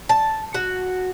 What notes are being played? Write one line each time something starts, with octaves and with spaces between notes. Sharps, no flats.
A5
F#4